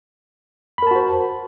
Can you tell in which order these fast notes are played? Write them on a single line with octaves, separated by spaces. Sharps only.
B5 A#4 A5 F#4 C5